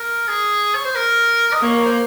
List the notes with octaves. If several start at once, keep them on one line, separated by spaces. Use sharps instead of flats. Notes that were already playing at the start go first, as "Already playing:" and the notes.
Already playing: A#4
G#4
C#5
C5
A#4
D#5
A#3 C#5
C#5
C5